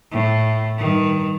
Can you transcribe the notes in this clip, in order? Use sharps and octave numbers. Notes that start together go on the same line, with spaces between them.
A2
G2 D#3